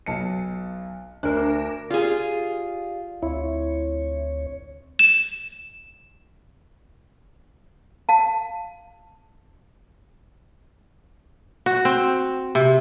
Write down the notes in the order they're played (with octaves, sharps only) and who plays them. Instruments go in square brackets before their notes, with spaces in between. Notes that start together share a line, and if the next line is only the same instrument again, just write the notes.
[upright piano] B1 A5 C#7
[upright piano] D2 [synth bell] D4 A#4
[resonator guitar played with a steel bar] F4 G#4 [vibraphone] G4 D5 F5
[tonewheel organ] D2 C#5 [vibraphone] C4 [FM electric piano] E4
[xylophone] E7
[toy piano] F5 A5
[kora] F#4
C4
C3